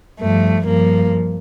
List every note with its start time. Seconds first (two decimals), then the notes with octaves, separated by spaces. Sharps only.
0.20 G2 F3 A3
0.66 G2 F3 A#3